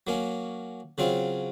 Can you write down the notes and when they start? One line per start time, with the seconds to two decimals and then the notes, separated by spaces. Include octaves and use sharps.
0.07 F#3 A#3 C#4
0.98 C#3 F#3 C4 F4